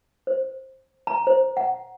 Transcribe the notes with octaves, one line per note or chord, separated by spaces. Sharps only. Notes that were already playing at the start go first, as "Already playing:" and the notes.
C5
A#5
C5
F#5